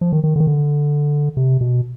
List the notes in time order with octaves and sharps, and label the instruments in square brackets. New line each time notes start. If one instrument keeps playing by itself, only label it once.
[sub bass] F3
D#3
D#3
D3
D#3
D3
C3
B2